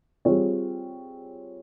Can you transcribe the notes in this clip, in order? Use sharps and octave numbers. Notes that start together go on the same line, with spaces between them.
G3 C4 F4 G#4 C#5